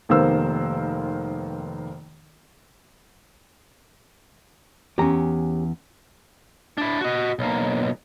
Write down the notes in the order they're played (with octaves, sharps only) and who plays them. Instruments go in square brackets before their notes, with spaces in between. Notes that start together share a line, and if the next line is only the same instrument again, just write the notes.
[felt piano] F1 D#3 A#3 B3 C5 E6
[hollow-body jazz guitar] E2 A#5 [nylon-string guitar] C#4 G4
[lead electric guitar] D4 E4
F#4 D#5
B1 A#3